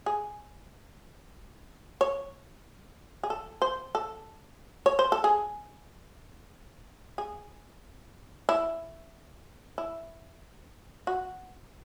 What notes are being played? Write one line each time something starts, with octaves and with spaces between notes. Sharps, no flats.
G#4
C#5
G#4
A4
C5
A4
C#5
C5
A4
G#4
G#4
E4
E4
F#4